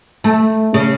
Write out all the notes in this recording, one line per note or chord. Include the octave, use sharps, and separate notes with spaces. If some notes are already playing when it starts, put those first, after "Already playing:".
A3
C#3